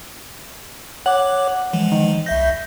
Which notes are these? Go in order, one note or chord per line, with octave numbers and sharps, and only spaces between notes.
C#5 F#5 D6
E3 F3 G#3
D#3
C2 E5 G6 A#6